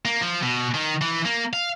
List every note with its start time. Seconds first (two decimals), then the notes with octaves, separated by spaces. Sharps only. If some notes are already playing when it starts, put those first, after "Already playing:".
0.05 A#3
0.21 F3
0.42 B2
0.74 D#3
1.01 E3
1.25 A#3
1.53 F5